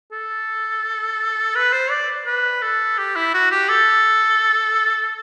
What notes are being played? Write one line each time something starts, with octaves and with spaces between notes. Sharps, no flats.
A4
B4
C5
D5
B4
A4
G4
E4
F#4
G4
A4